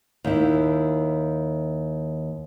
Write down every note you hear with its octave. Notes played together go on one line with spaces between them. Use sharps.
D#2 E4